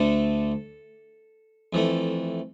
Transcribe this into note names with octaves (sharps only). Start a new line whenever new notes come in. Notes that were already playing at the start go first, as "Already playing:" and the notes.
Already playing: D2 D3 A3 A4
F2 E3 A3